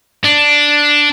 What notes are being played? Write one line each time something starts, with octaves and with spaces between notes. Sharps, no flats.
D4